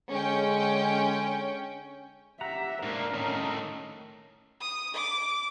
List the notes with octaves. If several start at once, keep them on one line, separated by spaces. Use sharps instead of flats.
D3 G#3 C#4 G5
G4 E5 F#5 A#5
G#2 A#3 D4 A#4
A2 D#3 C#4 D#5
D#6
D6